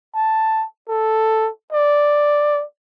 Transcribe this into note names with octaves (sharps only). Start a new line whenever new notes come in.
A5
A4
D5